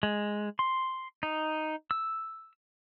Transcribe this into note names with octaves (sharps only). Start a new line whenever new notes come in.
G#3
C6
D#4
E6